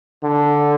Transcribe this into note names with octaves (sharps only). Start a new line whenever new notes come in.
D3